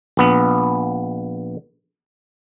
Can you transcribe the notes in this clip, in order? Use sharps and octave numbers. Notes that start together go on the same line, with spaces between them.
A#1 B3